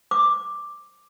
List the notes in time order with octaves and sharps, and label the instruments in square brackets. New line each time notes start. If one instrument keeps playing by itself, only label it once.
[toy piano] D6